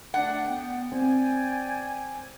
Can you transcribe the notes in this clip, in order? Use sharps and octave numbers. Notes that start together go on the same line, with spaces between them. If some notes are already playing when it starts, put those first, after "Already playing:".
D3 A3 D4 F#5
B3 G5
C4 D5 G5 G#5